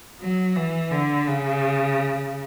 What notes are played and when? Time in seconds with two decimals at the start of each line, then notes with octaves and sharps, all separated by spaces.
0.21 F#3
0.56 E3
0.91 D3
1.27 C#3